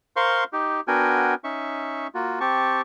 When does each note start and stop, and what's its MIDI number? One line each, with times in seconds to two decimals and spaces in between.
0.16 0.44 70
0.16 0.44 72
0.16 0.44 77
0.16 0.44 84
0.16 0.44 85
0.53 0.80 63
0.53 0.80 67
0.88 1.34 59
0.88 1.34 62
0.88 1.34 66
0.88 1.34 70
0.88 1.34 79
0.88 1.34 80
1.44 2.07 61
1.44 2.07 63
1.44 2.07 76
1.44 2.07 85
2.15 2.39 58
2.15 2.39 65
2.15 2.39 66
2.40 2.81 60
2.40 2.81 67
2.40 2.81 81
2.40 2.81 85